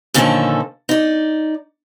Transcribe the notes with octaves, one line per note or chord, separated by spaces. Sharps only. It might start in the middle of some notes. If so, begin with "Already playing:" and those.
A#2 D3 D#3 F3 C#4 A4
D#4 D5